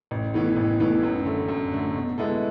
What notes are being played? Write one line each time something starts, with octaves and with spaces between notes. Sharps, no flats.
A1
A2 E3 B3
A1
A2 E3 B3
F#2
D3 A3
F#2
D3 A3
B2
G#3 B3 E4 A4